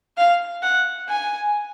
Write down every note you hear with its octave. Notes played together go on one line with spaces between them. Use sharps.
F5
F#5
G#5